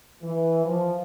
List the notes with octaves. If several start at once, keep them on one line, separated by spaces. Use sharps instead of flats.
E3
F3